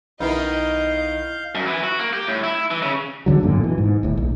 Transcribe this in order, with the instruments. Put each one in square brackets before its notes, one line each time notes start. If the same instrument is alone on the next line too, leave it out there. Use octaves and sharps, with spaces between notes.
[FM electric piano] B1 E4 [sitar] D#3 B3 D#4 [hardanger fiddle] D#5 [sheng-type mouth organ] F5 G6
[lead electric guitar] F#2
E3
F#4
A#3
G4
A2
E4
E3
C#3
[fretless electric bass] E2 D3 F#3
G#1 F#2 A#2 D3
B2 E3
G#2
D1 A2
A#1